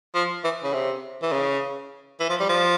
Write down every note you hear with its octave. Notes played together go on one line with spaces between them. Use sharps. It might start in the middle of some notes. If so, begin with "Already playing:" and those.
F3
E3
C#3
C3
E3
C#3
E3
F3
G3
F3